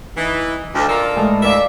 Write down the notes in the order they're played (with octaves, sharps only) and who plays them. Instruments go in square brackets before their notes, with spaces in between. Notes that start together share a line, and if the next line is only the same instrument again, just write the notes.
[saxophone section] E3 [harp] D#4
[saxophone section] D2 [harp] D5
[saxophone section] F4 A4 A#4
[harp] A2 E3 G#3
[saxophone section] D2 E5 [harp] A#4 D5 F5